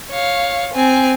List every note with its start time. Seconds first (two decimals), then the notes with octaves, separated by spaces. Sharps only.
0.11 C#5 F5
0.74 C4 G#5